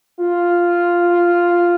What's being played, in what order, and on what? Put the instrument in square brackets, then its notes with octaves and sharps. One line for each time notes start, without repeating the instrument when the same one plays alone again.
[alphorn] F4